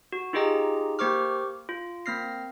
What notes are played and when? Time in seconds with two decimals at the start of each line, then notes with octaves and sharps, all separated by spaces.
0.12 F#4
0.33 D#4 F4 G4 G#4 D#5 A#5
0.99 A#3 G4 C5 C#6 D6 F6
1.69 F4
2.06 A#3 C4 F6 A#6 C7